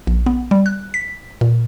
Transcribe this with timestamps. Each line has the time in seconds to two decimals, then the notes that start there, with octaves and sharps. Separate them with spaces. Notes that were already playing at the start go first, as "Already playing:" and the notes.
0.07 A#1
0.26 B3
0.51 G3
0.66 F#6
0.94 B6
1.41 A#2